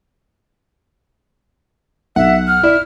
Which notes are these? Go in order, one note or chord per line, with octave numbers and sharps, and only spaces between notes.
B1 E5 F#5
F6
E4 D5